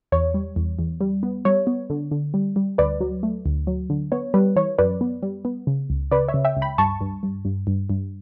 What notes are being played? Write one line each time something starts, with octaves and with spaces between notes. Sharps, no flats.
E2 C#5
G3
E2
E2
G3
B3
G3 C#5
B3
D3
D3
G3
G3
D2 B4 D5
F#3
A3
D2
F#3
D3
B3 C#5
G3 B4
E3 C#5
F#2 B4 D5
B3
G3
B3
C#3
C#2
C#3 B4 D5
C#5 E5
C#3
E5 G5
C#2
G5 B5
G2 A5 C#6
G2
G2
G2
G2
G2